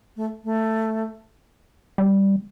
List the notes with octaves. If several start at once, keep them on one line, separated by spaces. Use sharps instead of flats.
A3
A3
G3